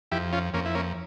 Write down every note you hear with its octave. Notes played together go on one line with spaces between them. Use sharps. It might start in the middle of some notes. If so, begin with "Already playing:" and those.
F2 E4 G4
C#4 F4
F2 A#3 C#4
E4
A#3 C#4